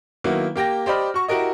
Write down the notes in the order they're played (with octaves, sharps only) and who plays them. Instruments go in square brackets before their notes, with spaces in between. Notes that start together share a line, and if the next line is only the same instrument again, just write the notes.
[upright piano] D#3 F#3 A#3 B3 E4
A#3 G4 G5 A#6
G4 C5 D5 D#5 B5 F6
F#4 C#6
E4 F#4 G4 A#4 D#5